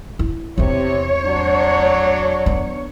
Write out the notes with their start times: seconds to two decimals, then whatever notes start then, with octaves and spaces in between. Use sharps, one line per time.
0.19 E4
0.58 E2 C3 C4 C#5
1.25 F#3 D4
2.46 B3